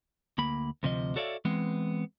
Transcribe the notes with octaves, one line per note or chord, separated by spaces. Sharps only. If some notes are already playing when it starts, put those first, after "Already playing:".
D2 A#3 B5
D2 C3 F3 D#5
F#4 A4 C#5 D5 E5 F5
E3 G#3 B3 C4